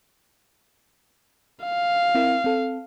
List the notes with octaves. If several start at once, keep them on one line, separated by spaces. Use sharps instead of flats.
F5
C4 E4 A#4
C4 A4